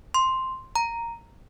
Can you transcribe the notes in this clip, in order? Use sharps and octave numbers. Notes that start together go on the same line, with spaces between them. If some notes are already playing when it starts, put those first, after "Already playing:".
C6
A#5